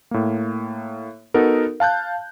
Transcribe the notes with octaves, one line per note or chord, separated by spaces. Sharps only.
A2 A#3
B3 D#4 F#4 A4 A#4
F5 A5 F#6 G6